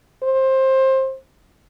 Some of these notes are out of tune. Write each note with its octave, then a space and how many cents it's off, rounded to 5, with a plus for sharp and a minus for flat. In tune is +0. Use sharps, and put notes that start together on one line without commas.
C5 +20